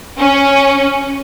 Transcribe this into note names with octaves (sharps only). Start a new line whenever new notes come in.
C#4